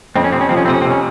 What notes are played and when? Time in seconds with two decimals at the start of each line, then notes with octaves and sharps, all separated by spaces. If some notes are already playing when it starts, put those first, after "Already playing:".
0.16 F2 C4
0.24 C#4
0.32 C3 C4
0.41 C#4
0.49 F3 C4
0.57 C#4
0.65 C3 C4
0.74 C#4
0.82 C4
0.85 C3
0.90 C#4